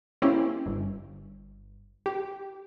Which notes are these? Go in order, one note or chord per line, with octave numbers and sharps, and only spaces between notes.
A#3 C4 C#4 E4 G4
G1
G4